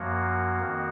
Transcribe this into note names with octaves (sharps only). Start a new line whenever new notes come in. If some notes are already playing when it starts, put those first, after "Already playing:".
Already playing: F#2 F3 A#3 C#4 F#4
F2 D#3 A#3